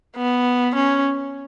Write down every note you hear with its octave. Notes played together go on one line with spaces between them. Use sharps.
B3
C#4